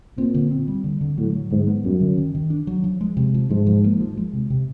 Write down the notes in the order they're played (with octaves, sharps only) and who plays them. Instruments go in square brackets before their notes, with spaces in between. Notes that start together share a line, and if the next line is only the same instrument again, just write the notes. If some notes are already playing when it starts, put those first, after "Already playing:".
[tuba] A#2 [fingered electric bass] C4
[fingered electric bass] D3
C4
G3
D3
D3
[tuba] A2 [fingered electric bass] F#3
[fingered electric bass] F#3
[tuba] G#2 [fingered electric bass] D3
[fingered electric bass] B3
[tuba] F#2 [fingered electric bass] G3
[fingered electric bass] D3
D#3
D#3
D4
F#3
F3
G#3
C3
F3
[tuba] G#2 [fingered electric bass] F3
[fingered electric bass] F3
A#3
F3
G#3
C3
C3